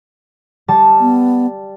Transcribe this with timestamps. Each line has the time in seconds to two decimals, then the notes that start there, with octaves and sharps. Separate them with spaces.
0.68 G3 A5
1.00 B3